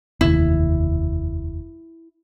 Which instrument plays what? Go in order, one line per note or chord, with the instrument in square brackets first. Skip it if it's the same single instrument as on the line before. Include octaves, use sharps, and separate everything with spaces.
[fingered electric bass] F1 D#2 [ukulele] E4